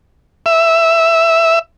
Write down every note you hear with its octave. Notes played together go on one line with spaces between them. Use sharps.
E5